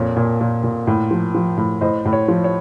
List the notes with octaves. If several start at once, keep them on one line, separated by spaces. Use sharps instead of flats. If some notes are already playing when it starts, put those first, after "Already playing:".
Already playing: F2 A#2 C#5
A#2
A#2
A#2
A2
F3
F3
A2
A2 C5 D#5
A2
C#5
F3
C#5